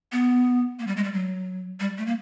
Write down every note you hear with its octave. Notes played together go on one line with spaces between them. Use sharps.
B3
A#3
G3
G#3
G3
F#3
G3
A3
A#3